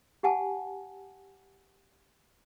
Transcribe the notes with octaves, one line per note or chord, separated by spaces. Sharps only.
G4 F#5 G#5 A5